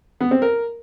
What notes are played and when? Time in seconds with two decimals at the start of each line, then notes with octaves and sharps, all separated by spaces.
0.21 B3
0.31 C4
0.42 A#4